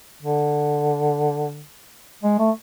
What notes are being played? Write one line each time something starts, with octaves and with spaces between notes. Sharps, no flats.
D3
G#3
A3